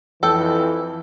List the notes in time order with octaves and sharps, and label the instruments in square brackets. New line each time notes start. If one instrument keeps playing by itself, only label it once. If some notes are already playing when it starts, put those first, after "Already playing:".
[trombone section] F2 E3 [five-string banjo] A4 G5